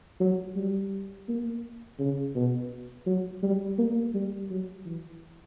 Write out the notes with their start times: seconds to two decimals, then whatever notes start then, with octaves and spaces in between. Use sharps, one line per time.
0.20 F#3
0.56 G3
1.28 A#3
1.99 C#3
2.35 B2
3.06 F#3
3.43 G3
3.78 A#3
4.14 G3
4.50 F#3
4.85 E3